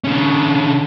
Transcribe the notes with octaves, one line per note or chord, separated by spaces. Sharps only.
D3 C#4